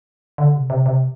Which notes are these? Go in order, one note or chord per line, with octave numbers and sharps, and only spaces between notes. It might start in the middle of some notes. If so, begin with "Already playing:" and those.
D3
C3
C3
C3